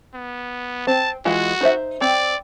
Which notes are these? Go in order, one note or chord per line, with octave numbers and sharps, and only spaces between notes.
B3
C4 A5
E3 G#3 F4 F#4
D#4 C5 E5
C4 D5